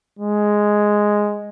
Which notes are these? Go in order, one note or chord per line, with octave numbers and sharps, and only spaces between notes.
G#3